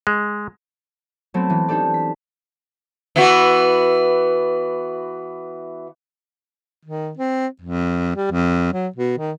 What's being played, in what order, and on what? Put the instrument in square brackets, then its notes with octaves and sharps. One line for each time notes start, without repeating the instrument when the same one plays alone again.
[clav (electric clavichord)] G#3
[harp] F#3 A3 B3 C4
E3
D4 D#4 G4 A4 D5
B6
[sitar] E3 B3 F#4
[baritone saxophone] D#3
C4
F2
G3
F2
F#3
B2
D#3